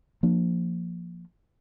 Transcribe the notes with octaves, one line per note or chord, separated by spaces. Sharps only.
F3 A#3 D4